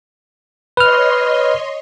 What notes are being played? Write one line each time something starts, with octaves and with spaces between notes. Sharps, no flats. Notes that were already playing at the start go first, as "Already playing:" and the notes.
B4 C#5 D#5 C6 F6